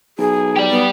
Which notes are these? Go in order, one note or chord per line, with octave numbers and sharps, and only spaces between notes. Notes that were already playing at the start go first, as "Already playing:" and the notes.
B1 G#4
G4 D5
B3